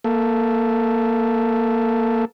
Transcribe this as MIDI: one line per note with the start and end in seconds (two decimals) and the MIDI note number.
0.04 2.25 58
0.04 2.25 69